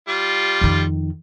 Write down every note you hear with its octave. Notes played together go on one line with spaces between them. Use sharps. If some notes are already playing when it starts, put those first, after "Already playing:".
G3 F4
F2 D#3